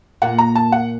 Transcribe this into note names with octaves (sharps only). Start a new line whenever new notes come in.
A#2 A#3 F#5
A#5
A5
F#5